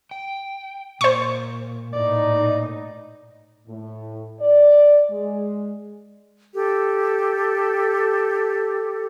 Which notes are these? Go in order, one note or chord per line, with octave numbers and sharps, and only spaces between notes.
G5
A#2 C5 C#6
A2 D#4 D5
A2
D5
G#3
G4 A4